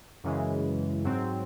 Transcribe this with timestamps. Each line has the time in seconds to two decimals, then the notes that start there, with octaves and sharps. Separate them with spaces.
0.24 F#2 C#3 E3 G#3
1.05 G#2 F#3 C4